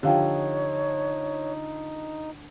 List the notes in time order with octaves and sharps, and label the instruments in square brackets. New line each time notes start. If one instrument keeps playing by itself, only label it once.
[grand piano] D3 F3 [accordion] D#4 [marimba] G4 F5 G5 [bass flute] C#5